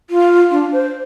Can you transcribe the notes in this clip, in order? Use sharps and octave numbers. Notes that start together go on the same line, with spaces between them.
F4
D4
C5